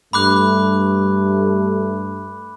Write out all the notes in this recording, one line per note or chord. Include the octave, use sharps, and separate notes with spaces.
G2 A3 B5 D6 F#6